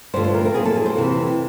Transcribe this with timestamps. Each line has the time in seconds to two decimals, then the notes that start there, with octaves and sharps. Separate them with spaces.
0.14 G2 D3 F3 A3 C5
0.24 C5
0.35 A#4
0.45 A#4
0.54 A2 F#3 A#3 G#4
0.65 A4
0.76 G#4
0.86 C5
0.95 F2 C3 E3